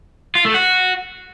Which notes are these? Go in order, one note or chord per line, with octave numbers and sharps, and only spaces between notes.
F4
A3
F#4